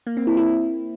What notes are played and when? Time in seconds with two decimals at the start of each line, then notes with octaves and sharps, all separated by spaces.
0.07 A#3
0.17 C4
0.27 E4
0.37 E4